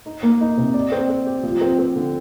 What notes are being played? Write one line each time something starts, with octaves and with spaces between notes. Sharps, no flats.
D#4
A#3
D#4
C3
D5
C4
C4
G4
F3
C4
C4
D3